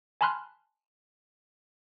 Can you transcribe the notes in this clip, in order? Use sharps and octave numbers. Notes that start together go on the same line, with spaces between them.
G#5 A5 B5 C6 F6 F#6